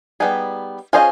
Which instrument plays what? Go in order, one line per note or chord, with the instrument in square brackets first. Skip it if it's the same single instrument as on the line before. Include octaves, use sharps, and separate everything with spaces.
[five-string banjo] G3 B3 D#4 G#4
C#4 F4 G#4 C5 D#5